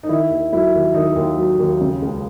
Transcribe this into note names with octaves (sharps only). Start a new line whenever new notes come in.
D#4
D#3 E4
D#2
F#3 E4
D#2
D#3 D#4
D#2
F#3
D#2
C#3
C#2